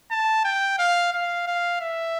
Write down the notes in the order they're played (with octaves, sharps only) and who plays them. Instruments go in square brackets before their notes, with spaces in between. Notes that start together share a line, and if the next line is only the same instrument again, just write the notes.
[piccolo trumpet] A5
G5
F5
F5
F5
E5